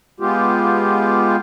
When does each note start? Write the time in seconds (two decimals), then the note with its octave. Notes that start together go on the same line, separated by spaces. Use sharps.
0.20 G#3 B3 F4 G4